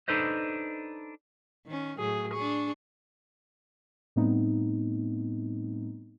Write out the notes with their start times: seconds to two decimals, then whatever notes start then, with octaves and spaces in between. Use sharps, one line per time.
0.08 D4 D#4 A4 B4 C5 D#5
1.66 D#3 C#4
1.98 A2 F#3 A3 G#4
2.33 D4 G#4 C#6
4.16 A2 G3 A3 B3 C4 D#4